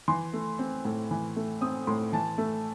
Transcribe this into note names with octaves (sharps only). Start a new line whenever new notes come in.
E3 C6
A3
C4
A2
E3
A3
C4 D#6
A2 C6
E3 A5
A3